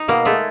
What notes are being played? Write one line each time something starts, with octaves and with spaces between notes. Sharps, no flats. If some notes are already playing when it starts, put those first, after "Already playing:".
Already playing: D#4
B2 A#3
G#3 A3